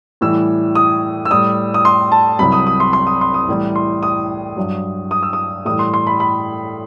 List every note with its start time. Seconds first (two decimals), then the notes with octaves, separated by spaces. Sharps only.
0.21 A2 E3 G3 E6
0.75 D#6
1.25 E6
1.30 A2 G3 D#6
1.74 D#6
1.85 C6
2.12 A5
2.39 C2 C3 F#3 B5
2.52 D#6
2.67 D#6
2.80 C6
2.93 C6
3.07 D#6
3.21 C6
3.34 D#6
3.48 A2 E3 G3
3.75 C6
4.03 D#6
4.57 G2 F#3
5.11 D#6
5.23 E6
5.33 D#6
5.65 A2 E3 G3 D#6
5.79 C6
5.94 C6
6.07 B5
6.20 B5